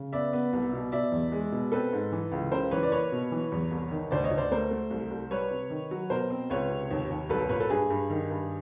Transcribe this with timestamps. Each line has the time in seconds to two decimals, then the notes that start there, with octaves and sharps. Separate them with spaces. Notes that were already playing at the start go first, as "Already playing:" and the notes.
Already playing: C#3
0.13 B3 D5 E5
0.33 B3
0.53 C2
0.73 B2
0.92 B2 D5 E5
1.12 E2
1.32 G#3
1.52 B2
1.72 C4 A4 B4
1.93 G#2
2.12 E3
2.32 C#2
2.52 C#3 A#4 C5
2.71 E3 B4 C#5
2.83 D5
2.92 A#3 B4 C#5
3.12 B2
3.32 E3
3.52 E2
3.71 C2
3.91 D#3
4.11 D2 C5 D5
4.24 C#5 D#5
4.31 D2
4.38 C5 D5
4.51 A3 A#4 C5
4.71 A3
4.91 C2
5.10 C2
5.31 G3 B4 C#5
5.51 C3
5.70 D#3
5.91 F#3
6.10 B2 A#4 C5
6.30 C4
6.50 C#2 B4 C#5
6.70 C3
6.91 D#2
7.10 D#2
7.29 C2 A4 B4
7.49 A#2 B4 C#5
7.60 A4 B4
7.70 G2 G#4
7.90 G2
8.10 D#3
8.30 G2